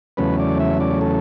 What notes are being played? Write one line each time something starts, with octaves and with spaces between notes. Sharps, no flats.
E2 C#3 F#3 A3 C#4 B4
D5
E5
D5
A4